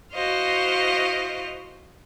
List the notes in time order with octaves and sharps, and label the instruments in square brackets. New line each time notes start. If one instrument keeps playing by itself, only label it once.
[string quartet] E4 F#4 C5 D#5 F5